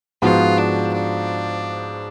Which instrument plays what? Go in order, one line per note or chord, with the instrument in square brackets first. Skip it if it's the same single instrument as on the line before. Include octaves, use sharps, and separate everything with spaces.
[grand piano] G#2 F3 B3 F#4 [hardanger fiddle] F4
[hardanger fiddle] D4
D4